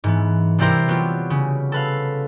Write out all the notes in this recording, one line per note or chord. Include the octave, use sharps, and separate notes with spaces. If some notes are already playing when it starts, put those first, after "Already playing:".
G#2 E3 B3
C3 G3 E4 G4 A#4 C5
F#3 B3 C4 F4 G4
C#3
A4 B4 F5